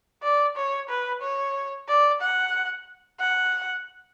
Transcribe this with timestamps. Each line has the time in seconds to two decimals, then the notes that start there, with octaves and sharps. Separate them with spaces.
0.23 D5
0.56 C#5
0.90 B4
1.22 C#5
1.88 D5
2.22 F#5
3.20 F#5